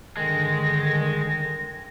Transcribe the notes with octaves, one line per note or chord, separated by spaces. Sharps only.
G2 D3 D#3 G#3 A#6